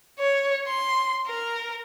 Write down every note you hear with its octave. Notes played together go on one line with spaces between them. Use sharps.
C#5
C6
A#4